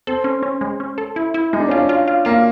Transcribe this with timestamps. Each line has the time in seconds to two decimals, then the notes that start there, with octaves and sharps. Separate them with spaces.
0.07 C4 A4
0.24 C#4
0.43 C#4
0.61 G#3
0.80 C#4
0.98 A4
1.16 E4
1.34 E4
1.53 G#3 D#4
1.60 D4
1.69 C#4 F4
1.77 D4
1.89 F4
2.08 F4
2.25 A#3 F4